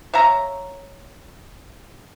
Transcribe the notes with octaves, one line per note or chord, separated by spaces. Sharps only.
C#5 E5 F5 A#5